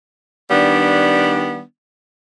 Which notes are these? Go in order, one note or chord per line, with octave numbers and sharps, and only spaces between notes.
D#3 G3 B3 D4